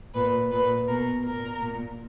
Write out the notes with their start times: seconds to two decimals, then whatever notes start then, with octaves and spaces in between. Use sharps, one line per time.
0.14 A#2 B4
0.51 A#2 B4
0.87 B2 A#4
1.24 A#2 A#4
1.60 A#2